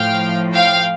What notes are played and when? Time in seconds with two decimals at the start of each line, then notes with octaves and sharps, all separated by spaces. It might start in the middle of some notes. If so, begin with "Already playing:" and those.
Already playing: A2 F3 F5 G5
0.53 F5 G5